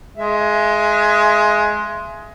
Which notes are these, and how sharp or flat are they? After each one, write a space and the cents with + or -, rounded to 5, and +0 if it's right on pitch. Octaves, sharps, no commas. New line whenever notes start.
G#3 +15 E5 +40